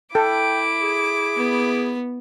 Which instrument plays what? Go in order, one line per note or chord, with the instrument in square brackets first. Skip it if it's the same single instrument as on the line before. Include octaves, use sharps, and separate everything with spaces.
[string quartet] E4 D6 [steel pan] A4 [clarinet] G5
[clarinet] G#4
[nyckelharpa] B3